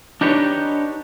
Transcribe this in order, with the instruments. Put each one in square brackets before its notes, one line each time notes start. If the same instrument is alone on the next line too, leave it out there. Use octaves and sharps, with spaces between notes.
[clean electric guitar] D4 D#4 G4 B4 C#5